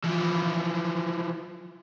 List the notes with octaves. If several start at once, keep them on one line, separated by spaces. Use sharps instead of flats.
E3 F3